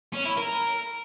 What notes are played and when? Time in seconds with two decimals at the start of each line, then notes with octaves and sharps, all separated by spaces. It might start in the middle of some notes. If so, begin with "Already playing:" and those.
0.13 C#4
0.25 E4
0.37 A#4